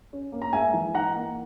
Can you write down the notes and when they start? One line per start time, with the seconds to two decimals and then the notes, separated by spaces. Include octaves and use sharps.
0.13 C#4
0.32 A#3
0.42 A#5
0.53 G#3 E5 G#5
0.73 E3
0.94 D#4 F#5 A#5
1.15 A#3